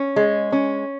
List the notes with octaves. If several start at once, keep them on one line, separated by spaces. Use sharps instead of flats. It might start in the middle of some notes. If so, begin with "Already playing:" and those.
Already playing: C#4
G#3
C#4